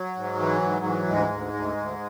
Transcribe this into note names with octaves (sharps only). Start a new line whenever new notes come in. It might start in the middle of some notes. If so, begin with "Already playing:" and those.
Already playing: F#3
G#2
E3
G#2
E3
D2 G#2 G#3
D2
D2
D2